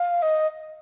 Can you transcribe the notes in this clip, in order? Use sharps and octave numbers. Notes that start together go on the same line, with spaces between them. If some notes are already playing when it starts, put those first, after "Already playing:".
Already playing: F5
D#5